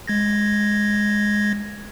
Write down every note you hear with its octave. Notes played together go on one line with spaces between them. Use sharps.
G#3 G#6 A#6